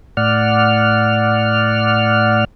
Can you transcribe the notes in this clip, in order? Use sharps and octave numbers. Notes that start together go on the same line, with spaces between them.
A2 D5 F#5 F6